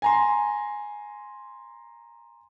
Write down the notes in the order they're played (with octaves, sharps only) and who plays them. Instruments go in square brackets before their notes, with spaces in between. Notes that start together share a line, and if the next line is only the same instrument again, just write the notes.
[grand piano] G#5 A#5 C6